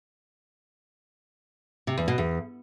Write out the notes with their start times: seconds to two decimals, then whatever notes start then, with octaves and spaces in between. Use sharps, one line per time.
1.87 C3
1.98 E2
2.08 B2
2.18 E2